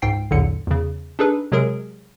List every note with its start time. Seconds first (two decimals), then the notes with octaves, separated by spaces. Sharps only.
0.02 C#2 G#2 G5 C7
0.31 B1 E2 A2 D3 C#7
0.67 E2 C#3
1.19 D4 D#4 G#4 A4 B4
1.52 C3 F#3 G#3 G#4 A#4 D7